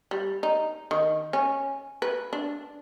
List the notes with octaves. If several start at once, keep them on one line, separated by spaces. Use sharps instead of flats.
G3
D#4
D#3
C#4
B4
D4